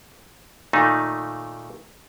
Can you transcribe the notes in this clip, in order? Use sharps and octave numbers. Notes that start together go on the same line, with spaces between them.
A#2 D#3 A3 D#4